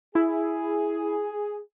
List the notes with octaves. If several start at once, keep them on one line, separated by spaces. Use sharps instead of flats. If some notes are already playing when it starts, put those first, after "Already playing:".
E4 G#4